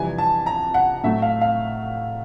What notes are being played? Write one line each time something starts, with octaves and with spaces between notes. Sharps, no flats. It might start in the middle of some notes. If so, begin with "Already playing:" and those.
Already playing: F2 C3 E3 G3 G#5
A5
A#5
F#5
A2 F#3 A3 E5
F5
F5